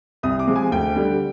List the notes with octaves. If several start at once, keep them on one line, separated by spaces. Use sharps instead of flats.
C2 D#6
D6
C3 F3 G#3
G#5
D2 G5
D3 G3